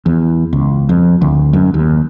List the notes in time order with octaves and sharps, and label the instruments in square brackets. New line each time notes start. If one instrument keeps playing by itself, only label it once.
[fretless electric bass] E2
C#2
F2
D2
F#2
D#2